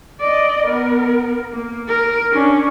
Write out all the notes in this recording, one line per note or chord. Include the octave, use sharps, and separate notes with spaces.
D5 D#5
B3 A#4
A#3
A#4
C#4 D4